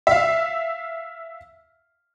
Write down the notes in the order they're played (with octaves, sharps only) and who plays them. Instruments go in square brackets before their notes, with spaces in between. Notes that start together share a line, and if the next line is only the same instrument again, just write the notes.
[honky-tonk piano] E5 F5